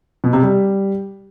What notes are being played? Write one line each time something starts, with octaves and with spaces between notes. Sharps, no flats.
B2
C3
G3